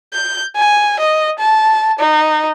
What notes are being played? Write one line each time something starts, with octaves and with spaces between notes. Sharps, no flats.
G6
G#5
D#5
A5
D#4